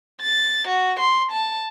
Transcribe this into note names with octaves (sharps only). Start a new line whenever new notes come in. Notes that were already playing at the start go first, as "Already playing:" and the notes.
A6
F#4
C6
A5